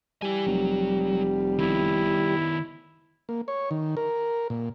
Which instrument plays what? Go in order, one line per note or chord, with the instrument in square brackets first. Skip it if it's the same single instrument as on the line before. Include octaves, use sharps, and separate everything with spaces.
[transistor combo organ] G3 [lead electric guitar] E4 G#5
[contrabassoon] F1 [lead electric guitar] F#3
[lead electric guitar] D#3 B3 [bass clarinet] E4
[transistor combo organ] A#3
C#5
D#3
A#4
A#2